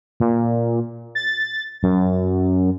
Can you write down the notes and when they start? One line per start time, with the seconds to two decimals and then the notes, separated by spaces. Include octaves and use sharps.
0.20 A#2
1.15 A6
1.83 F#2